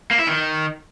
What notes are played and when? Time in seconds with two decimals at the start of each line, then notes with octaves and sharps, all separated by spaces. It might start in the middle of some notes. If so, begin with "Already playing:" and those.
0.11 A#3
0.19 E4
0.27 D#3